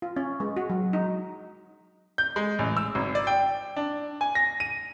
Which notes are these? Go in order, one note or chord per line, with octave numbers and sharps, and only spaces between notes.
F4
C#4
G#3
F#4
F#3
D#4
G6
G#3
A1
E6
G#1
D5
G5
D4
G#5
A#6
D#7